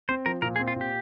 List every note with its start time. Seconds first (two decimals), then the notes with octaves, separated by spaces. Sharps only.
0.09 C4 C5
0.26 F3 A#4
0.42 A#2 A#4
0.56 G#4
0.59 C4
0.68 F4
0.76 A#2 G4